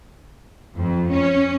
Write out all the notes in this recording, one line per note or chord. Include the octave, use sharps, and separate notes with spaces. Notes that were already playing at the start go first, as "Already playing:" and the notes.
F2
C#4